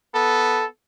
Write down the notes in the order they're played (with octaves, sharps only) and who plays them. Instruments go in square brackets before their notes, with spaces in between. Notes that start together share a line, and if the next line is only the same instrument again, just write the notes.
[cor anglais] B3 [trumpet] A4